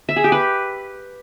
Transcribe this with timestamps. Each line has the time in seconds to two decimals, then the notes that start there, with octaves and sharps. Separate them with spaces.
0.09 E5
0.16 G#4
0.24 G4
0.32 B4